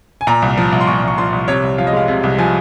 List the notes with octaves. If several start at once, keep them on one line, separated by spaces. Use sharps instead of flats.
G#5
A#2 A#5
C2
F3
C2
C6
A#2 C#6
C2 C#6
F3 C6
C2
C3 C#5
C2
F3 F5
D#5
G#3 F5
C3
C2
F3 G#5